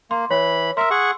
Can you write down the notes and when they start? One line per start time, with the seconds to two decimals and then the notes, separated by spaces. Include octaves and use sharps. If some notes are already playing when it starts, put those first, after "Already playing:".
0.11 A#3 C6
0.31 E3 C#5 B5
0.77 A#4 E5 C6 E6
0.91 G#4 F#5 C#6